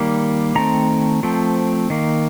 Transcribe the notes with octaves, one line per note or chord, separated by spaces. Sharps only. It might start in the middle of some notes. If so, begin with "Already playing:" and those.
Already playing: D#3 G3 A#3
D#3 A3 C4 A#5
F3 A3 C4
D#3 A#3